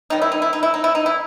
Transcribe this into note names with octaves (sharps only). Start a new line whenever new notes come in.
D#3 G3 C#4 D#4
E4
D#4
E4
D#4
E4
D#4
E4
D#4
E4